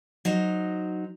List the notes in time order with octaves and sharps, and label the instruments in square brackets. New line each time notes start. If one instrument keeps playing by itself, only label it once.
[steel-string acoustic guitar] F#3 D#4 C5